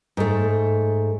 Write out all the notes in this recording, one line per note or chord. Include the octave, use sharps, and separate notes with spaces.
G#2 A3